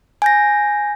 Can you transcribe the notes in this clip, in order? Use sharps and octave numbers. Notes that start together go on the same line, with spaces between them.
G#5 G6 A#6